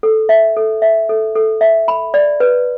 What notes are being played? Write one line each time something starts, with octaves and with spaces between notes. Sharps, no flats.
A4
E5
A4
E5
A4
A4
E5
B5
D5
B4